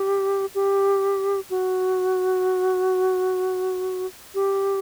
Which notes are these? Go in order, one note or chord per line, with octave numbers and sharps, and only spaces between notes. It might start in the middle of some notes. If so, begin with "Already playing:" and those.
Already playing: G4
G4
F#4
G4